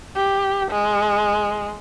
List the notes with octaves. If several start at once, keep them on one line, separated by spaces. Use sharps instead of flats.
G4
G#3